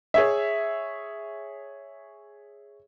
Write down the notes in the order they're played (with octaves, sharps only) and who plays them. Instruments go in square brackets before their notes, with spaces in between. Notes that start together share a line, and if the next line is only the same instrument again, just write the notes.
[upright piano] G#4 C#5 E5